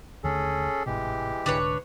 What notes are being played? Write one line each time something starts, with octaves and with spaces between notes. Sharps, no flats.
D#2 D3 A3 C#4 G#4 A4
G#1 A2 C3 E3 G#3 G4
C2 G#2 D3 D4 B4 C#5